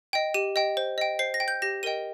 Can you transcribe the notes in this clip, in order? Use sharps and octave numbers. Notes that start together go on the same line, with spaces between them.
D#5 G5
G4 D#7
D#5 G5
C5
D#5 G5
C5 C7
A#6
G5
G6
G4 A#6
A#4 D#5 G5 D#7